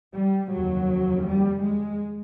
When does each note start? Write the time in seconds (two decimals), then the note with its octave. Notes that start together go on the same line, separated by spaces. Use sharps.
0.14 G3
0.51 F1 D#2 C#3 F#3
1.24 G3
1.61 G#3